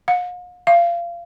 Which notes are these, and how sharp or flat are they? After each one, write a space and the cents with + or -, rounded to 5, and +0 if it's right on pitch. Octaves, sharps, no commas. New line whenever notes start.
F5 +45
F5 -25